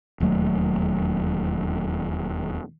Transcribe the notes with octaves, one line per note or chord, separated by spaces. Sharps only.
E1 D#2 F#3 A3